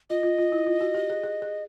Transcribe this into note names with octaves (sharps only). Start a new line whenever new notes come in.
F4 D#5
F4
F4
E4
F4
F#4
G4
G#4
G#4
G#4